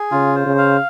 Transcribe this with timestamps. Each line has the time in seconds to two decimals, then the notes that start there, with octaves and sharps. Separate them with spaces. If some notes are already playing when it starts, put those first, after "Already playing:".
Already playing: G#4
0.11 C#3 F4
0.35 C5
0.46 C#3
0.58 F5